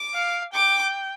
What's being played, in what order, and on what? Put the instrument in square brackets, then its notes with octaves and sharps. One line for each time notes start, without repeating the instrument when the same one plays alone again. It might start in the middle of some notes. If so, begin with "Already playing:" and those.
Already playing: [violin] D6
[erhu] F5
[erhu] G5 [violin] D6